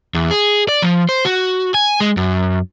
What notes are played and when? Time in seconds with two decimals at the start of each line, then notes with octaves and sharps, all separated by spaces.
0.14 E2
0.31 G#4
0.69 D5
0.82 F3
1.09 C5
1.25 F#4
1.74 G#5
2.00 G#3
2.17 F#2